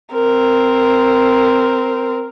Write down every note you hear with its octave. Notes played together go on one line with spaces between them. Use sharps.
C4 A#4